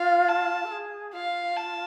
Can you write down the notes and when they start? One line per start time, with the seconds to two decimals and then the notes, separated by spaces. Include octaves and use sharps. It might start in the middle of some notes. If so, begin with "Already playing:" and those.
Already playing: F4 F5
0.28 A5
0.65 A4
0.71 G#4
1.13 F4 F5
1.56 A5